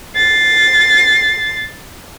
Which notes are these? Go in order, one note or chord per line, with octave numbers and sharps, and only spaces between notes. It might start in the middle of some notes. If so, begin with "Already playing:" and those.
A6 C7